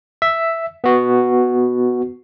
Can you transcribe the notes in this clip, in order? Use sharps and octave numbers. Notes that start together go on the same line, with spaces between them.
E5
B3 F#4